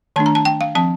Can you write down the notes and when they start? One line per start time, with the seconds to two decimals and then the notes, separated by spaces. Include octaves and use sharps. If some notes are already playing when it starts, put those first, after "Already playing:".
0.16 D#3 A3 D4 A5
0.26 A#5
0.35 A5
0.45 G5
0.61 F5
0.75 F3 C4 A5